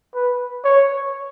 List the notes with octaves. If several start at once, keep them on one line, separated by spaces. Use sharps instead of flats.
B4
C#5